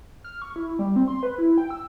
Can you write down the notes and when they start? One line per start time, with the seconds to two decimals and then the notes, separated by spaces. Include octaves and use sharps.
0.24 F6
0.42 C#6
0.56 E4
0.79 G3
0.96 C4
1.08 C6
1.23 B4
1.38 E4
1.58 G5
1.70 E6